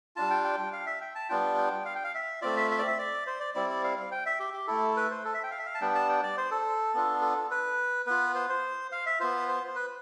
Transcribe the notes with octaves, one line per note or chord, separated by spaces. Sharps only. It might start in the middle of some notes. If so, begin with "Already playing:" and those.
G3 D4 F4 A5
G5
G5
F5
E5
G5
A5
G3 B3 D4 F4 G5
G5
F5
G5
F5
E5
A3 C4 F4 D5
E5
E5
D5
E5
D5
C5
D5
G3 C4 E4 D5
D5
F5
F5
G5
E5
G4
G4
A3 E4 A4
B4
C5
A4
E5
G5
F5
E5
F5
A5
G3 B3 D4 G5
A5
G5
D5
C5
A4
B3 D4 F4
A4
B4
B3 F4 B4
C5
C5
F5
E5
B3 F4 C5
C5
C5
B4